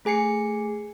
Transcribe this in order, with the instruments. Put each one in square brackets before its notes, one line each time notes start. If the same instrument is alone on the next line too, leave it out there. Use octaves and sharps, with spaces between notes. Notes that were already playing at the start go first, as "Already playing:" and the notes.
[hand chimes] A3 G#4 G#5 C7 C#7